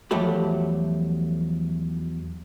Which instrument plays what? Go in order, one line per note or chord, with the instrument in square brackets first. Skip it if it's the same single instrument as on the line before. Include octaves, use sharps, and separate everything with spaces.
[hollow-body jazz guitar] E2 F3 F#3 A3 G4 B5